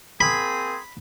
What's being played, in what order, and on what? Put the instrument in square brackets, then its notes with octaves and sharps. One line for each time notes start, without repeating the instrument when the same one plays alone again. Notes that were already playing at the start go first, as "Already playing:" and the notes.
[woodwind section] A#3 C4 G#4 [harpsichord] B5